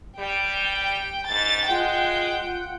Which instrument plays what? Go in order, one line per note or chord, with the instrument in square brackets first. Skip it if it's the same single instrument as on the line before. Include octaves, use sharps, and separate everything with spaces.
[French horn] G3 [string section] G5
[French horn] G#2 [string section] A6
[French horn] G#3 [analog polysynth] F4 F#5 [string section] G5